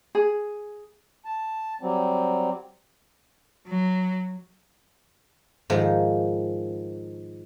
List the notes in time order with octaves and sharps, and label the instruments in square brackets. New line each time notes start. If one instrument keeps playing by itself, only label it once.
[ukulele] G#4
[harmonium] A5
F#3 G3 C4
[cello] F#3
[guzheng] G#2 D#3 F3